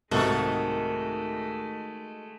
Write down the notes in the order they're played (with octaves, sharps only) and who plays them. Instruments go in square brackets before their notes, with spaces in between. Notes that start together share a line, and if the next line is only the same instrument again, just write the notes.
[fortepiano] C2 G#2 [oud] D#3 [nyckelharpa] G#3 A3 [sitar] F#4 A4